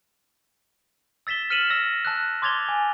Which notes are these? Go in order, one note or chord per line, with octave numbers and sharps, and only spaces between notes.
E6 A6 B6 E7 G7
F6 B6 C#7 D#7 E7 F#7
E6 A#6
A5 E6 F#6
C6 D6 G#6 A6 F7 G7
G#5